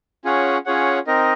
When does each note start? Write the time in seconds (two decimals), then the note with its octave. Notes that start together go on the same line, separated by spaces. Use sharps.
0.25 C#4 F4 G#4 C#5 F#5
0.66 C#4 F4 G#4 C#5 F#5
1.07 C4 D#4 A#4 D#5